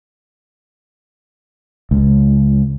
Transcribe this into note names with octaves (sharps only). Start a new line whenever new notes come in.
C#2